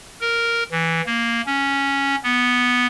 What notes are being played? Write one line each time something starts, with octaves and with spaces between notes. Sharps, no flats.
A#4
E3
A#3
C#4
B3